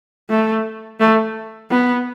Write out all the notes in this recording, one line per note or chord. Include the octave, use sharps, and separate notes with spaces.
A3
A3
B3